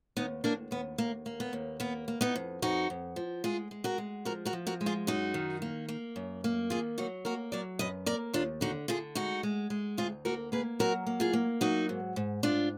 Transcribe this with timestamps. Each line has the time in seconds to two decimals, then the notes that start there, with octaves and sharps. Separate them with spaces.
0.17 D#2 B3 D#4
0.44 D#2 A#3 D4
0.71 D#2 B3
0.98 D#2 A#3
1.26 A#3
1.40 B3
1.53 D#2
1.80 A#3 B3
2.08 A#3
2.21 B3 D#4
2.36 F2
2.62 F2 D#4 F#4
2.90 F2
3.16 F3
3.44 G#3 F4 G#4
3.71 G#3
3.84 F#4 A#4
3.98 G#3
4.25 F3 F#4 A#4
4.45 F#4 A#4
4.53 F3
4.67 F#4 A#4
4.81 G#3
4.86 F4 G#4
5.07 F#2 D#4 F#4
5.34 D#3
5.62 A#3
5.89 A#3
6.16 F#2
6.44 A#3
6.70 D#3 F4 G#4
6.98 F#3 D#4 F#4
7.25 A#3 F#4 A#4
7.52 F#3 A#4 D5
7.79 F#2 B4 D#5
8.06 A#3 A#4 D5
8.33 D#2 D4 F4
8.61 D3 D#4 F#4
8.88 D3 F4 G#4
9.15 G#3 D#4 F#4
9.43 G#3
9.70 G#3
9.97 D2 F4 G#4
10.25 A#3 F#4 A#4
10.52 A#3 G#4 B4
10.79 F#3 F#4 A#4
11.07 A#3
11.20 F4 G#4
11.33 A#3
11.61 F#3 D#4 F#4
11.89 G#2
12.16 G#2
12.43 G#2 D4 F4